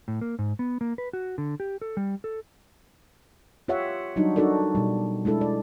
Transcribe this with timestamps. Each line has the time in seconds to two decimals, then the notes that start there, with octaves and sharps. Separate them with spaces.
0.08 A2
0.21 A#3
0.39 G#2
0.59 B3
0.81 A#3
0.98 B4
1.13 F#4
1.38 D3
1.60 G4
1.82 A4
1.97 G3
2.24 A4
3.68 F4 G4 C#5 E5 F#5
4.16 F#3 G3 D4 D#4 F#4
4.36 D4 D#4 F#4 A4 A#4 D5
4.75 B2 G3
5.25 G#3 D4 E4 A4
5.41 D5